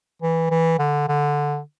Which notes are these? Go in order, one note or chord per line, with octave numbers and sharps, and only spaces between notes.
E3
E3
D3
D3